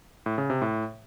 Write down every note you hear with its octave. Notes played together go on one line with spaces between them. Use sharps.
A2
C#3
C3
A2